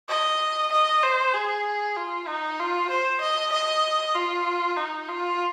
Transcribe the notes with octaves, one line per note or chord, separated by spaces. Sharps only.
D#5
D#5
C5
G#4
F4
D#4
F4
C5
D#5
D#5
F4
D#4
F4